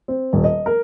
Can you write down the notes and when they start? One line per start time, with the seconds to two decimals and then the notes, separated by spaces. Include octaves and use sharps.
0.08 C4
0.33 D#1
0.44 D#5
0.66 A#4